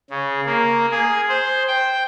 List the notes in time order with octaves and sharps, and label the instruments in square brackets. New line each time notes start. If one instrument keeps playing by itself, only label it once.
[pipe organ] C#3
A#3
G#4
C5
G5